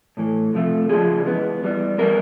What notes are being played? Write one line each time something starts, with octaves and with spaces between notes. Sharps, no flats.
A2 E3 A3
C3 F3 A3
C#3 F3 A#3 C#4 G#4
E3 G#3 B3
E3 G3 B3
E3 G3 B3 A#4